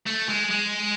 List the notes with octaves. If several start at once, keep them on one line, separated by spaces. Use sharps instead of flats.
A3
G#3
G#3